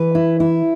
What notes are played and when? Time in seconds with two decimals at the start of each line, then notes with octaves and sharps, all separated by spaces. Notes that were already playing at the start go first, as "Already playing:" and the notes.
Already playing: E3 B4
0.15 E4
0.40 E4